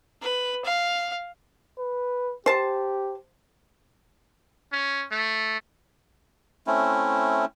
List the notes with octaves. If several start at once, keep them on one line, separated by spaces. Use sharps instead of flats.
B4
F5
B4
G4 C5 A5
C#4
A3
A3 C4 C#4 E4